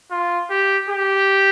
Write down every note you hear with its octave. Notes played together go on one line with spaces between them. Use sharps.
F4
G4
G4